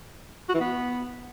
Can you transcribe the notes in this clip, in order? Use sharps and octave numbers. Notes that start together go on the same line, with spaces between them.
F#4
E3
B3